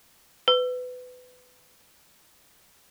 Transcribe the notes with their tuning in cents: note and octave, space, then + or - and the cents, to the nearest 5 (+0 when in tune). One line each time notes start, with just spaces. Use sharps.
B4 +25